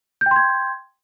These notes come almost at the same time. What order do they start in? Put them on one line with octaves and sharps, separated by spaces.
G6 G5 C6 G#6